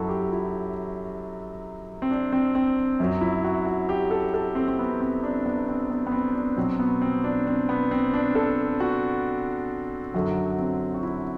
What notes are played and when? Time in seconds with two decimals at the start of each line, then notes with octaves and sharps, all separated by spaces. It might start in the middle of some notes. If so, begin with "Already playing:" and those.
Already playing: F#2 F#3 E4 F#4 A4
0.09 G4
0.32 E4
2.02 C4
2.11 D4
2.33 C4
2.55 C4
3.00 F#2 F#3
3.21 E4
3.44 F#4
3.66 F#4
3.89 G4
4.11 A4
4.34 A4
4.55 C4
4.68 C4
4.79 B3
5.01 C4
5.23 D4
5.46 B3
5.68 C4
5.90 B3
6.07 B3
6.12 C4
6.35 D4
6.57 B2 F#3 C4
6.80 B3
7.02 C4
7.24 D4
7.47 C4
7.69 B3
7.91 C4
8.14 D4
8.35 A4
8.80 F#4
10.14 F#2 D3 F#3 F#4
10.59 C4
10.94 F#4
11.03 E4